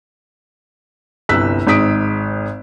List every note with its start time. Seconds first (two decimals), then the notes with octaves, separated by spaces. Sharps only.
1.29 G1 C2 E6 F#6 B6
1.67 G#1 G#2 D#6 B6 D7